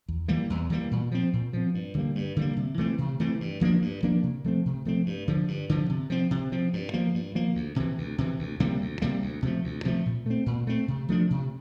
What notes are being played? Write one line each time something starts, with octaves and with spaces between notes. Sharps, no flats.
E2
E3 G3 A#3
E2
E3 G3 A#3
A#2
F3 C4
A#2
F3 C4
G2
D3 G3 A#3
G2
D3 G3 A#3
C3
E3 A3 C4
C3
E3 A3 C4
G2
F3 A#3 D4
G2
F3 A#3 D4
C3
F3 A3 C4
C3
F3 A3 C4
G2
D3 F3
G2
D3 F3
C3
F3 C4
C3
F3 C4
G2
F3 A#3
G2
F3 A#3
D2
C3 E3
D2
C3 E3
D2
C3 G3 A#3
D2
C3 G3 A#3
D2
C3 F3 A3
D2
C3 F3 A3
A#2
A3 C4
A#2
A3 C4
C3
F3 A3 D4
C3